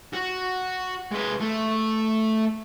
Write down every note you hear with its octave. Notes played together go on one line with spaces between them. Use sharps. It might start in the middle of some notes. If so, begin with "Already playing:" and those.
F#4
G#3 B4
A3